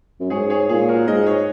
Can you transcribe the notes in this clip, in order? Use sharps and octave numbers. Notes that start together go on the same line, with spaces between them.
F#2
G#2 G#4 C#5
G#4 C#5
A#2 G#4
F#4 A#4
G#2 A#4 D#5
G#4 C#5